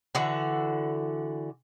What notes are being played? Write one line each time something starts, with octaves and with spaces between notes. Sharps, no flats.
D3 E3 F#4